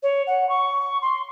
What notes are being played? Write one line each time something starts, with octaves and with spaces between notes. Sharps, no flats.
C#5
F#5
C#6
C6